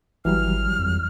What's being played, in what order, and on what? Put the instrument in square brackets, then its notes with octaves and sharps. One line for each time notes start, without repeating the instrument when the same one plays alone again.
[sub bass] G#1 [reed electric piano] E3 F#3 G3 [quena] F6
[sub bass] F2